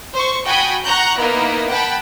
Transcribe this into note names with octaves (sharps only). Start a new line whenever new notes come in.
C5 C#6
F#4 G5 G#5 B5 D#6
F#5 A#5 C#6 F#6 G6
A#3 B3 D#4 E4 A#4
F#5 G5 A5 B5